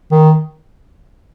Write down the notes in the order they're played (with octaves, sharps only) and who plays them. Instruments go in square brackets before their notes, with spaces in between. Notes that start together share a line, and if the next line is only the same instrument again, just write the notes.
[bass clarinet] D#3